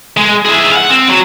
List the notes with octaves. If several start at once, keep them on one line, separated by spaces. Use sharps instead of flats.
G#3
E4 G#4
F5 F#5
C4
F#3